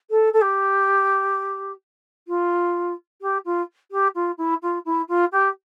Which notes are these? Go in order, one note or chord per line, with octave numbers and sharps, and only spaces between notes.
A4
A4
G4
F4
G4
F4
G4
F4
E4
F4
E4
F4
G4